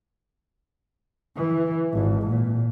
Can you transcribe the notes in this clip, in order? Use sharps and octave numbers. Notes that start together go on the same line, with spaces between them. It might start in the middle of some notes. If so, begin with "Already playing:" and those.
E3
G#1
A#2